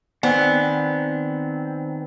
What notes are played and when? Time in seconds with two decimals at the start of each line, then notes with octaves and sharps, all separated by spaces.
0.23 D#3 B3 C4 C5 D5 G#5